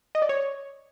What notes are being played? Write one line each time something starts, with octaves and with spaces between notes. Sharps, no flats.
D#5
D5
C#5